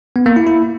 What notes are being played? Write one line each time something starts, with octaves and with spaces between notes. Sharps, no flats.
B3
A#3
E4
E4